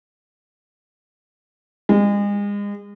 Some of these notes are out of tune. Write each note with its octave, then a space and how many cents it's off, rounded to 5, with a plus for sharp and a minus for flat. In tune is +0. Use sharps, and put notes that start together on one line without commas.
G#3 -35